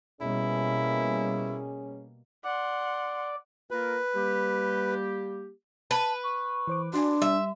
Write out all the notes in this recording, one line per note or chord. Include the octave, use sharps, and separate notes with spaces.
B2 G3 A#3 C#4 E4 G#4
D5 F#5 C6
A#3 F4 A#4 B4
G3 A#3 G4
B4 A5
C#6
E3 C5 D6
D4 F#4 D5 G#5 C6
G3 E5